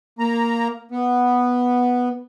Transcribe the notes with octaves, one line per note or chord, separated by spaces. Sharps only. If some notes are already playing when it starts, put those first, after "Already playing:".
A#3 A#5
B3